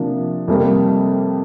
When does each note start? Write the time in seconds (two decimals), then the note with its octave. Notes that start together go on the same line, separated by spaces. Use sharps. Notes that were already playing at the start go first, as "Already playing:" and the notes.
Already playing: C3 F3 A#3 D4
0.48 F2 C3 G3 A#3